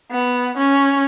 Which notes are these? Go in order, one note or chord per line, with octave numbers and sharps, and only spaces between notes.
B3
C#4